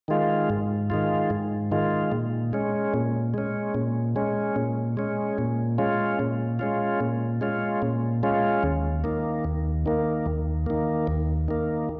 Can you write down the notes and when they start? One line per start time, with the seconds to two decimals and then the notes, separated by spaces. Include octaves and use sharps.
0.08 D#3 G#3 F4
0.50 G#2
0.90 D#3 G#3 F4
1.30 G#2
1.71 D#3 G#3 F4
2.12 A#2
2.53 G#3 C#4
2.94 A#2
3.34 G#3 C#4
3.74 A#2
4.16 G#3 C#4
4.56 A#2
4.97 G#3 C#4
5.38 A#2
5.78 G#3 C#4 F4
6.19 A#2
6.59 G#3 C#4 F4
7.00 A#2
7.41 G#3 C#4 F4
7.82 A#2
8.23 G#3 C#4 F4
8.63 D#2
9.04 D#3 A#3
9.44 D#2
9.86 D#3 A#3
10.26 D#2
10.66 D#3 A#3
11.07 D#2
11.48 D#3 A#3